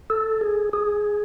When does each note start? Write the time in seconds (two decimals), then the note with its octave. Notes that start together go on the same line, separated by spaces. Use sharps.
0.10 A4
0.41 G#4
0.73 G#4